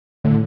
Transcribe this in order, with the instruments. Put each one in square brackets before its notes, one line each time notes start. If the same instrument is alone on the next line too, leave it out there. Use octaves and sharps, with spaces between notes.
[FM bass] A2 [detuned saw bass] D3